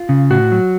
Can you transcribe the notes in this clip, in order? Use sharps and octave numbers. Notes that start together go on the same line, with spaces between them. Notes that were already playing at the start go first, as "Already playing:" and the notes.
Already playing: F4
C#3
A2 F#4
F#3